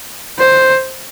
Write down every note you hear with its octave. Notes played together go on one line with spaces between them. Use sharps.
C5